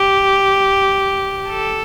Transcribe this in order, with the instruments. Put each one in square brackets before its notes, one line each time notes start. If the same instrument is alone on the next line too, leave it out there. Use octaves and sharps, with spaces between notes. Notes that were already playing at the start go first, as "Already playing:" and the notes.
Already playing: [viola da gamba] G4
A4